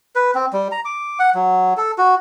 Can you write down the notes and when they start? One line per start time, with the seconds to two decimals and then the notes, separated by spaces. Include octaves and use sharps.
0.16 B4
0.35 C4
0.53 G3
0.72 A#5
0.85 D6
1.19 F#5
1.35 F#3
1.77 A4
1.98 F#4